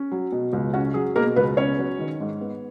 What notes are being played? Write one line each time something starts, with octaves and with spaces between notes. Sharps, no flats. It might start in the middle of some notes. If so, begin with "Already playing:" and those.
Already playing: C#4
F#3
B2
C#2
C#4 F#4
F#3 G#4
B2 A#3 A#4
C#2 B3 B4
B3 C#4 C#5
F#3
D#3
G#2
B3